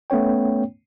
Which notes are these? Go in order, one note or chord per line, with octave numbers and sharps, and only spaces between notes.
A3 B3 C#4 C#5 G5